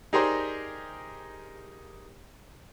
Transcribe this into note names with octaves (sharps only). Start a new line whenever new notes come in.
D#4 G4 G#4 A#4 C5 D5